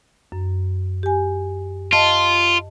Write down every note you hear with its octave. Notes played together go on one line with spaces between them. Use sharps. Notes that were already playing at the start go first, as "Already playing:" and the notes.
F#2
G4 G#5
F4 D#5 A5